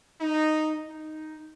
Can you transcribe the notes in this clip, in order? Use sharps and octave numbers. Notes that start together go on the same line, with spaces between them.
D#4
D#4